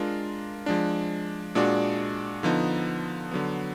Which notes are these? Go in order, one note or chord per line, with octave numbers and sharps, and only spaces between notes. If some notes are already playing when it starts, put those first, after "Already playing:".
Already playing: G#3 D4 F4 A#4
F3 G#3 D4
A#2 G#3 D4 F#4 D5
D3 F3 B3 D#4
D3 F#3 B3